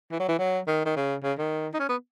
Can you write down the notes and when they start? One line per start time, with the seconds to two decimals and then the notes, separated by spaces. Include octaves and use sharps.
0.11 E3
0.20 F#3
0.28 E3
0.39 F#3
0.67 D#3
0.85 D#3
0.96 C#3
1.23 C#3
1.38 D#3
1.74 D#4
1.79 C#4
1.89 B3